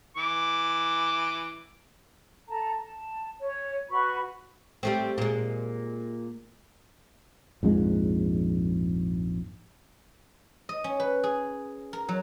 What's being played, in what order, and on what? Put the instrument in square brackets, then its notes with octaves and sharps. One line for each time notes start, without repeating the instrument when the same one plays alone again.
[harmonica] E3 D6
[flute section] A4 A5 A#5
A5
C#5
F#4 B4 B5 C#6
[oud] G3 A3 C4
A#2 G#3
[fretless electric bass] A#1 F2 G#2 G#3
[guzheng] D#5
C#4
B4
G#4
A#4
F#3